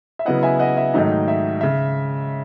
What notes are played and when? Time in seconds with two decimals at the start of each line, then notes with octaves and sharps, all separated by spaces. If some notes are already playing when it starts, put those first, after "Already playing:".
0.19 E5
0.25 C#3 F#3 B3 E4 D#5 F#5
0.43 E5 G#5
0.59 D#5 F#5
0.77 E5
0.94 G#2 D#3 F#3 A3 D#4
1.28 E5
1.61 C#3 E5